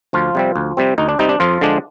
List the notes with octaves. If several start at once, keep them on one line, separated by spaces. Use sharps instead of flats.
D2 F3 F4
C3 G3 C4
D2
C3 G3 C4
D2 D#4
D4
C3 G3 C4 D#4
D4
F2 F3 F4
D3 G#3 D4